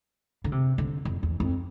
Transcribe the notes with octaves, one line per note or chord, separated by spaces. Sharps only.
D3
C3
D3
F2
E2
F2